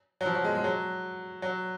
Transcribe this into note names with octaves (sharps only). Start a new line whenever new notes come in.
F#3
F3
F#3
G#3
G#3
F#3
F#3